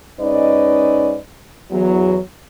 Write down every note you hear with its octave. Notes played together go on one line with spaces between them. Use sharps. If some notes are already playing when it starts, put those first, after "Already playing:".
G#2 C#4 D#4 B4 D5 D#5
E2 F#3